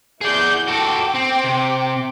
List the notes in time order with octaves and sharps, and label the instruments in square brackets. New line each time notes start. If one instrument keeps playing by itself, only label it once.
[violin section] E4 F#5 G6 [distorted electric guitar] G#4 D5
[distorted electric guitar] F#4 A4 [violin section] G5 D6
[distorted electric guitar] C4
C3